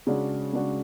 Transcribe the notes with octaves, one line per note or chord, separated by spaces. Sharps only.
C#3 G#3 D4 F#4
C#3 G#3 D4 F#4